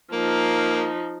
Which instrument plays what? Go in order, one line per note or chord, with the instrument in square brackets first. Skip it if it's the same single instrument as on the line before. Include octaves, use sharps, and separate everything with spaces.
[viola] F3 D#4 [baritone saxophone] A#3